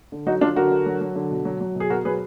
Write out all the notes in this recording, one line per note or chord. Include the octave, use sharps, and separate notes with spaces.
D3
F#3 D#4 F#4
F#3 D4 F4
D3 F#4 A#4
D3
F#3
F#3
D3
B2
F#3
F#3
B2 G#4
B2 F#4 A#4
F#3 G#4 B4